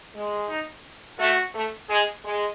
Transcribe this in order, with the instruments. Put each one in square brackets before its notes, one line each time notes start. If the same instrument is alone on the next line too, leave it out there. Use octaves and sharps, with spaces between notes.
[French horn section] G#3
[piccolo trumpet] D#4
[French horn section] A3 [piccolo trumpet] F#4
[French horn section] A3
[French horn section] G#3 [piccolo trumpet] G#4
[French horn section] G#3